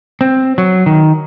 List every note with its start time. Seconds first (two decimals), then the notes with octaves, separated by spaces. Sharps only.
0.21 C4
0.58 F#3
0.86 D#3